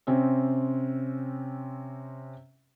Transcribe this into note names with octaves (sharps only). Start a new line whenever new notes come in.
C3 C4 C#4